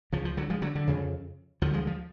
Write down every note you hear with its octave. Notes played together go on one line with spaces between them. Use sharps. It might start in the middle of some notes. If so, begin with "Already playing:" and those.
C#2 C#3 F3
F3
D3 F#3
F3 G#3
D3 F#3
D3
F2 C#3
D2 D3 F3
F3 G#3
F3